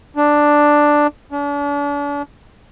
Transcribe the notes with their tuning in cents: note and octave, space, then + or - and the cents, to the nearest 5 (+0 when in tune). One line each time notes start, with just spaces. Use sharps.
D4 +5
D4 -40